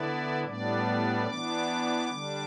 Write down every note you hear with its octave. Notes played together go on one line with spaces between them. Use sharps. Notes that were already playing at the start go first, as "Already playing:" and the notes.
Already playing: D3 B3 E4 D5
A2 G3 B3 D4 D5
E3 B3 D4 D6
D3 G3 D4